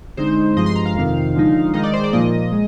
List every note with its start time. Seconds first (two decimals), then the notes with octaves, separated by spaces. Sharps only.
0.17 D3 G#3 C4 D#4 C5
0.57 G2 F3 G#3 D#5
0.66 C6
0.76 A#5
0.86 F5
0.96 F2 C3 D#3
1.35 D3 F3 G#3 D#4
1.74 D#3 G#3 D#4 D#5
1.83 D5
1.93 C5
2.04 D5
2.13 A#2 F3 A#3 D#5
2.52 G#3